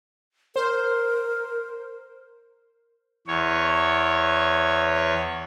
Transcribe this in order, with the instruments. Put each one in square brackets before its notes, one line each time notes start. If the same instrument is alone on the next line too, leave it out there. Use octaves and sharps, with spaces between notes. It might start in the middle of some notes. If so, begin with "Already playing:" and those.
[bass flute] A#4 [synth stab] C5
[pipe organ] E2 C#5